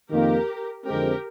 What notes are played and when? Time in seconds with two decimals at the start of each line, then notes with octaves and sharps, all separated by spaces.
0.10 F2 D#3 A#3 G4 A#4
0.86 F2 D3 G#3 C4 G4 A#4